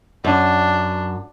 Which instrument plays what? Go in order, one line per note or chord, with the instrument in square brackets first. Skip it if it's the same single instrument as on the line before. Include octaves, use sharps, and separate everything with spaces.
[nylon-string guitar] F#2 [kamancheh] D4